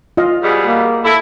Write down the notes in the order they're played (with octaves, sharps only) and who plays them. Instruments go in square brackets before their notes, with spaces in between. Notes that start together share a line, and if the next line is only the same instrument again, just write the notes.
[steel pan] F4 D#5 F5
[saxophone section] G#2 B2 G3 [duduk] G#4
[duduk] A#3
[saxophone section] E4 [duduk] A4